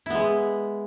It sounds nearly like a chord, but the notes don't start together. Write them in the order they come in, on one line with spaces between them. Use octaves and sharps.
E4 B3 G#3